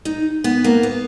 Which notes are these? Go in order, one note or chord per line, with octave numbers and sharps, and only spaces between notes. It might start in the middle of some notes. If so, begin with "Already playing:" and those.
D#4
B3
A#3
B3